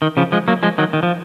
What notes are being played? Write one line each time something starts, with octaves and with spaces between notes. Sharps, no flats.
D#3
C#3 F3
F3 G#3
F#3 A#3
F3 G#3
D#3 F#3
D#3
F3